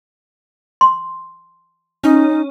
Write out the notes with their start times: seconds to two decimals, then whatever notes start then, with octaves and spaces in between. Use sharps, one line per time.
0.81 C6
2.04 C#4 D#4